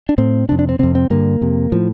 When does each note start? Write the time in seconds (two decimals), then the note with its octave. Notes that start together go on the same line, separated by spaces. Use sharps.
0.09 D4
0.18 A2 C4
0.49 C3 D4
0.52 F2
0.59 D4
0.69 C4
0.79 F2 C3 C4
0.95 C4
1.10 G2 D3 A#3
1.41 F2 C3
1.72 A2 F3